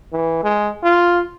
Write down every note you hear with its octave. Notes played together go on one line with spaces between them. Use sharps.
E3
G#3
F4